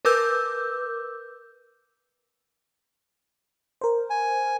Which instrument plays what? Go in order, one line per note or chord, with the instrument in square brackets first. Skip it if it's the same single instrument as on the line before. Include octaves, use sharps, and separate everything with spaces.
[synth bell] A#4 B4 D6 E6 G6
[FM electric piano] A#4 C5
[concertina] G#5